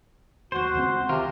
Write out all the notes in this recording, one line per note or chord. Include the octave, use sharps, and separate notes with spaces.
D1 D#2 F#4 C5
C#2 G#3 C4
C3 D#3 F4 A#4